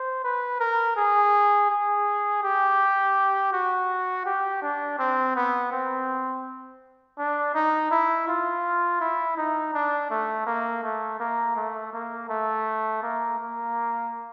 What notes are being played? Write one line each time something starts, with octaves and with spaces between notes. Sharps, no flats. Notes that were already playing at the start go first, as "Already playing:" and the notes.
Already playing: C5
B4
A#4
G#4
G#4
G4
F#4
G4
D4
C4
B3
C4
D4
D#4
E4
F4
E4
D#4
D4
A3
A#3
A3
A#3
A3
A#3
A3
A#3
A#3